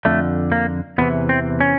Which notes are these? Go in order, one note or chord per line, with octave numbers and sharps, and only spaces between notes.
F2 D3 A3
A#3
E2 C3 E3 B3
C4
C#4